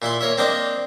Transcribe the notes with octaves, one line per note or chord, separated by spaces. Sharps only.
A#2 E4 E5 C6
A#3 A#4 C#5 E5
A#3 C4 D4 D5 D#5 A#5